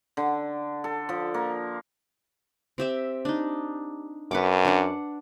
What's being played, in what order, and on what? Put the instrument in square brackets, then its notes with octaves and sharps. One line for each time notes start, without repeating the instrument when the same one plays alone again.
[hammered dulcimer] D3
A4
F3
A#3
[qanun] C4 G4 E5
D4 D#4
[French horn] F#2 [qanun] B4 F#5 D6
[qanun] D4 F#5